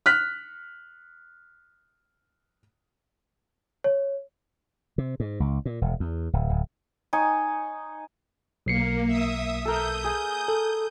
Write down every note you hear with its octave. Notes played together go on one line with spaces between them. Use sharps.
F6 F#6 B6
C#5
C3
G#2
C#2
A#2
E1
E2
D1
D1
D#4 G#5 C#6
B1 A#3 C7 C#7
E5 D#6
A4 A#4 D#6 G6
G#4
A4